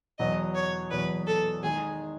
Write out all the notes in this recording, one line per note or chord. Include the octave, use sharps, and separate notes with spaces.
E2 B2 F#3 B3 D#5
C#5
E2 B2 F#3 B3 B4
A4
D#3 G#3 D#4 G#4